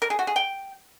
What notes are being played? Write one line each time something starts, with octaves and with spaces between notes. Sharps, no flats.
A#4
G#4
F#4
G#4
G5